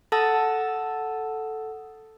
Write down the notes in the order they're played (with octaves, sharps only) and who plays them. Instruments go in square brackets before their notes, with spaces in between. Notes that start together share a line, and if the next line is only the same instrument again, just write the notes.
[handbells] A4 F#5 A5 D#6 E6 A6